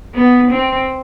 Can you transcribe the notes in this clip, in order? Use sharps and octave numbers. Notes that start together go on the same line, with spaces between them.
B3
C4